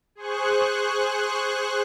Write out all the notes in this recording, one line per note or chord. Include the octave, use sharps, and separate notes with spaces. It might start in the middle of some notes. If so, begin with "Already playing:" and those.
G#4 C5 C#6 F#6